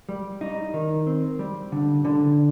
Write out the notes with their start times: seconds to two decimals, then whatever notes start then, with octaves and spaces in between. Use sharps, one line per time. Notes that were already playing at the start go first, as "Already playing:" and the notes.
0.09 G3
0.41 D#4
0.74 D#3
1.07 C4
1.39 G3
1.72 D3
2.05 D3